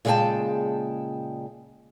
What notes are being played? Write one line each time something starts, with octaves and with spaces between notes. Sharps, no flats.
A#2 C#3 G#3 F#4 G5 A5